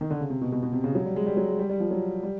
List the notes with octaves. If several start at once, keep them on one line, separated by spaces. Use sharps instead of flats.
D#3
D3
C#3
C3
B2
B2
B2
C3
C#3
F#3
G3
G#3
G3
F#3
G#3
G3
G3
F3
F#3
G3